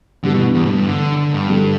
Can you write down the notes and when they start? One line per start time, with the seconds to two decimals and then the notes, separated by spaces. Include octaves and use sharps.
0.24 G2 D3 E3 G3 B3 G4
0.34 B2
0.55 E2
0.66 A2
0.70 G2
0.86 D3
1.17 D3
1.32 G2
1.48 D3 G3 D4 A4